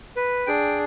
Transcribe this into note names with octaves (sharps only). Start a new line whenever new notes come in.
B4
D4 G#4 G5